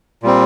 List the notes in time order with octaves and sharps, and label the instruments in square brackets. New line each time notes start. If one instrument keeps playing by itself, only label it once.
[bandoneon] A#2 G3 C4